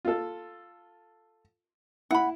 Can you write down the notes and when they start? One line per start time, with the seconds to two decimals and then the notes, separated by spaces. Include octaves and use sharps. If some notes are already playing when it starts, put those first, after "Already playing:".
0.05 F4 A4
2.11 E4 F#5 B5